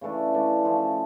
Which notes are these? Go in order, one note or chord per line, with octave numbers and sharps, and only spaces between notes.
C#3 E3 A3 D4
C#3 E3 A3 D4
F3 A3 C#4 F#4